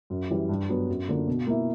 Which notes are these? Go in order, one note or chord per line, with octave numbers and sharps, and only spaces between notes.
F#2
E3 G3
G2
F#3 B3
F#2
D3 A#3 D4
B2
A#3 E4